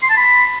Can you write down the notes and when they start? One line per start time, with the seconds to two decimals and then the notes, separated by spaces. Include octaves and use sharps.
0.03 C6
0.10 A5
0.17 B5